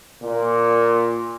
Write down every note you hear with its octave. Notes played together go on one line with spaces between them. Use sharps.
A#2